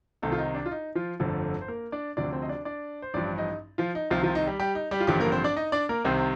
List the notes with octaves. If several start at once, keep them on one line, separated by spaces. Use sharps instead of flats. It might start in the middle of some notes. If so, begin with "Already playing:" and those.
C2 C3 D#3 A3 A4
F4
D#4
D4
F4
D#4
F3 F4
G1 F2 D3 F3 A3 A4
C5
A#3 A#4
D4 D5
D2 C3 F3 D4 D5
C4 C5
D#5
D4 D5
D4 D5
C5
A1 G2 F3 D4 D5
D#4 D#5
F3 F4
D#4
C2 C3 D#3 F3 F4
F3 F4
D#4
G3 G4
G3 G4
D#4
G3 G4
F4
A1 G2 D3 F3 G3 G4
A#3 A#4
C4 C5
D4 D5
D#4 D#5
D4 D5
A#3 A#4
C2 C3 D#3 C4 C5